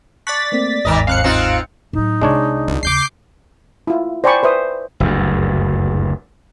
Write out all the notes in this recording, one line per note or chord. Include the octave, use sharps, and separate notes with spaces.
D5 A5 C#6 F#6 A6 B6
A3 A#3 C4
G1 D#2 G#2 D#3 A#4 D#5
F2 F5 F#6 C#7
C4 D#4 F4
A2 F#3 D#4
C2 G#3 D4 C#5
C#2 A3
D#2 C#3 D6 G6 C7
E4 F4
C5 D5 G5 G#5 B5 C#6
B4 C5 E5 D#6
F#1 D2 G2